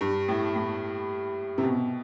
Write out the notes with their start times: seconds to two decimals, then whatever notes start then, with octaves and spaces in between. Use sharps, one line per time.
0.01 G2
0.28 A2
0.56 A2
1.58 C3
1.63 B2